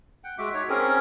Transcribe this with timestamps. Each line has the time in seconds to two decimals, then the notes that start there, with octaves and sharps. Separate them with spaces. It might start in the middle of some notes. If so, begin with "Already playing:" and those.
0.24 F#5 G5
0.38 G#3 F#4 E5 D6
0.54 D#4 F#4 C#5
0.69 C4 C#4 G#4 A#4